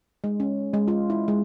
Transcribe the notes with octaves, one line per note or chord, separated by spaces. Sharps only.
G#3
C#4
G#3
F4
E4
G#3